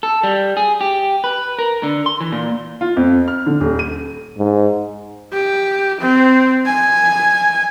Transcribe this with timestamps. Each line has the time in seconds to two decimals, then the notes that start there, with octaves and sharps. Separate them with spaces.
0.03 A4
0.23 G3
0.57 G#4
0.81 G4
1.24 B4
1.59 A#4
1.83 D3
2.06 C6
2.21 E3
2.32 A#2
2.81 F4
2.97 F2
3.28 F6
3.47 D3
3.61 D#1
3.79 D#7
4.38 G#2
5.33 G4
6.01 C4
6.66 G#5